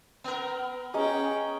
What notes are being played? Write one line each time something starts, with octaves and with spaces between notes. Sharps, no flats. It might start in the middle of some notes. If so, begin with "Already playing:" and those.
B3 A#4
C#4 G#4 D#5 G5 A#5